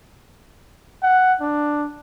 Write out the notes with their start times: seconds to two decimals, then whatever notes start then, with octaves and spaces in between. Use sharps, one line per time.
1.03 F#5
1.41 D4